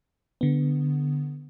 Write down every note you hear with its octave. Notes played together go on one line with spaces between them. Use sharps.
D3 B3